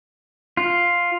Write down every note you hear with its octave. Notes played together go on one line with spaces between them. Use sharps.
F4